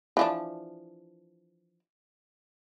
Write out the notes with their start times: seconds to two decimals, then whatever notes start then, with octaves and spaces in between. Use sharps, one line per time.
0.17 E3 F3 D4